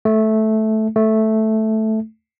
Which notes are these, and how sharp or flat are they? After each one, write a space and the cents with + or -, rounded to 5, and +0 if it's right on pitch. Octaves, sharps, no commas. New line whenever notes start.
A3 -10
A3 -5